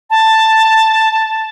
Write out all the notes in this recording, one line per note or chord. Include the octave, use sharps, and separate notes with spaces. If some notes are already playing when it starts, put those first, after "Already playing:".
A5